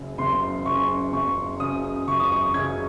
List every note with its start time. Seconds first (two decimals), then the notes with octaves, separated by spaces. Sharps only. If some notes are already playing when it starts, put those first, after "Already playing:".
Already playing: F#1 F#2 C#3
0.18 F#1 C6
0.65 F#2 C#3 C#6
1.12 F#1 C#6
1.60 F#2 C#3 D#6
2.08 F#1 C#6
2.20 D#6
2.32 C#6
2.54 F#2 C#3 G#6